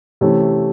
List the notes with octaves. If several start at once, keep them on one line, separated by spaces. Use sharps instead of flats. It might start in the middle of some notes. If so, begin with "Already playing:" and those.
C3 E3 A3 C#4